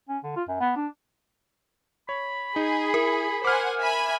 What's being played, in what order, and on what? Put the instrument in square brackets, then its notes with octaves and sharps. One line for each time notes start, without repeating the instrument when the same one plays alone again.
[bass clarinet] C#4
D3
F4
F#2
B3
D4
[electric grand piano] C#5 [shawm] B5
[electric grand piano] D#4 [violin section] G#4
[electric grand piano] E4 [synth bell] A#4
[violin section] C5 F#5 G#5 [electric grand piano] D6 F6
[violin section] E5 G#5 B5